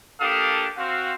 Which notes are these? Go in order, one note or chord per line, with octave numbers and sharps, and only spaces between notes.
A#3 D4 G4 A4 F5 D#6
C4 F#4 F5